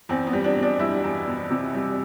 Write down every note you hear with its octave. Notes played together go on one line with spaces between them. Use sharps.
E2 C4
B3
G3
D4
B2
D4
G3 E4
E2
B2
C3
G3